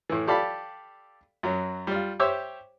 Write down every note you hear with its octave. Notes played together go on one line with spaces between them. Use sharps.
A2 E3
G4 A4 D5 F5 A5 B5
F#2 F#3
G3 F4
G4 C5 C#5 E5 D6 E6